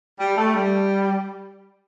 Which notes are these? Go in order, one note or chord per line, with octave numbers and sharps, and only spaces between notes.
G3
A3
G3